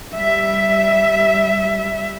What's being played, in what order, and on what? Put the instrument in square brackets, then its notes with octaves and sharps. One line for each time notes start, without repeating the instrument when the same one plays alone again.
[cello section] G3 E5